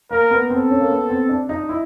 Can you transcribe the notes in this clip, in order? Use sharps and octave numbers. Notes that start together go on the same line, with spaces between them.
A#3 A#4
B3
C4 A4
C#4
A#3
B3
C4
D4
D#4
E4